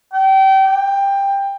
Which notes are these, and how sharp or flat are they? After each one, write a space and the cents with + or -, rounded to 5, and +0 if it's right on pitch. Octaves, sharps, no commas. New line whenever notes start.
G5 -30
G5 +15